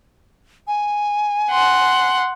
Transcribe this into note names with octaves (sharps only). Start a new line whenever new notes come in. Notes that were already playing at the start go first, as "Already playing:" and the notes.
G#5
F#5 C6